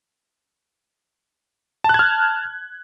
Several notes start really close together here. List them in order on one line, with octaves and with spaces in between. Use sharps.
A5 F#6 G#6 F6